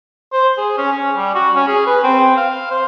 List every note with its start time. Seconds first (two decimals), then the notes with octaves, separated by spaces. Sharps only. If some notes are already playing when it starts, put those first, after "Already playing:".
0.33 C5
0.58 G#4
0.78 C#4
0.92 C#4
1.16 G3
1.35 F#4
1.56 C#4
1.68 G#4
1.87 B4
2.04 C4
2.37 F5
2.71 C5